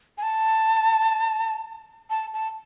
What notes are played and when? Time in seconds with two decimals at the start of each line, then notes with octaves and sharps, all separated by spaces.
0.18 G#5
0.23 A5
2.10 A5
2.34 A5